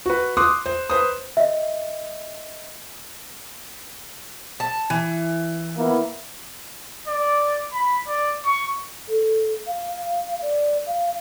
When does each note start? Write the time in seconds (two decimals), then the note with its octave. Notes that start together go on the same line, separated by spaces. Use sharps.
0.06 F#4 B4
0.37 C6 D6 D#6 F#6
0.66 C5
0.90 B4 C5 D#6
1.37 D#5 E5
4.60 A5
4.90 E3
5.78 A#3 B3 E4
7.08 D5
7.74 B5
8.08 D5
8.46 C#6
9.08 A4
9.67 F5
10.42 D5
10.87 F5